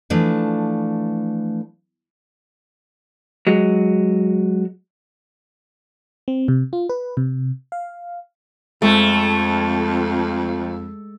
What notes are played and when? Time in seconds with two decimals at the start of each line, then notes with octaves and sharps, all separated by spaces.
0.10 E3 F3 A3 D4
3.47 F#3 G#3
6.28 C4
6.48 C3
6.73 F4
6.89 B4
7.17 C3
7.72 F5
8.82 F2 G#3 A3